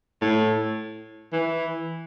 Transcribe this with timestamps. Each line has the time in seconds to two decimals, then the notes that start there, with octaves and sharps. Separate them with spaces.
0.22 A2
1.33 E3